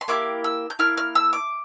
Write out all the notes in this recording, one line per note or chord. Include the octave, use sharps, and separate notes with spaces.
C6
A#3 E4 G4 D6
E6
G6
A#3 E4 F6
F6
E6
D6